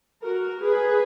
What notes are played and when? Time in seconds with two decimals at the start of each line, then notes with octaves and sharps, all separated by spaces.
0.23 F#4 A#4
0.62 G#4 B4